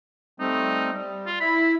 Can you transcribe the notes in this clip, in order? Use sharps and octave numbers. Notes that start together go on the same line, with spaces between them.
G3 A3 C4 D#4
G3
F4
E4 B5